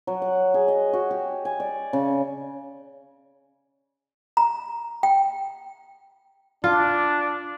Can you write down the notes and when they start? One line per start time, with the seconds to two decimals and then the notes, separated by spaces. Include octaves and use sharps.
0.07 F#3
0.22 F#5
0.54 G#4
0.68 D#5
0.93 F#4
1.11 G4
1.45 G#5
1.60 D5
1.93 C#3
4.37 A#5
5.03 G5
6.64 D4 F4